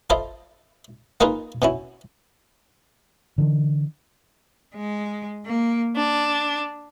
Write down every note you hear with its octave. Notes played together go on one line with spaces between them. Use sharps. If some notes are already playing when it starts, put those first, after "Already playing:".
F4 A4 C5 D#5 E5 B5
A#3 D#4 F4 G#4 A#4 B4
B2 C#4 E4
D3 E3
G#3
A#3
D4